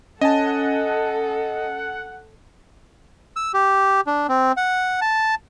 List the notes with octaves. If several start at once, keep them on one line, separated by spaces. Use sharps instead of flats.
C#4 A4 D#5 F#5 G#5 A5
E6
G4
D4
C4
F#5
A5